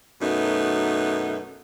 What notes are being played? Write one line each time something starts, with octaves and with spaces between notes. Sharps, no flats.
F#2 B2 A3 B3 D#4